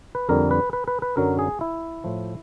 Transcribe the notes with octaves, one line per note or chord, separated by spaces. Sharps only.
B4
F2 D3 G3 A#4
B4
B4
B4
B4
F#2 D3 F#3 A#4
G#4
E4
A2 F3